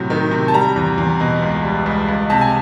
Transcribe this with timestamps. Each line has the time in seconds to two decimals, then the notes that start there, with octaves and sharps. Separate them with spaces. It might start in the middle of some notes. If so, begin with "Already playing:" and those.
Already playing: A2 C3 F#3
0.10 D#3
0.31 C3
0.48 A5
0.54 G3 A#5
0.76 E2
0.98 E2
1.20 B2
1.42 C#2
1.64 G3
1.86 C#2
2.08 C#2
2.30 C3 A5
2.41 G#5